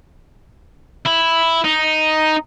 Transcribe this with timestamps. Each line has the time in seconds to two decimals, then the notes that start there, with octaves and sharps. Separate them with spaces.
1.06 E4
1.64 D#4